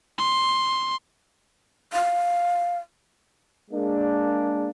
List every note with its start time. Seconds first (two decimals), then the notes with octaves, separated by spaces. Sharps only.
0.18 C6
1.93 F5
3.71 G#3 A#3 D4